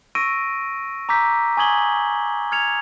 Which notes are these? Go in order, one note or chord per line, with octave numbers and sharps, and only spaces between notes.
C#6 E6 A#6 D7 D#7
A#5 D6 E6 G6 B6
G#5 C#6 D#6 G#6 F#7 G7
F6 G#6 C#7 F7